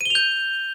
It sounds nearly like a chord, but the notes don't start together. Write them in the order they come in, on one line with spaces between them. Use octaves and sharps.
D#7 G7 F7 G6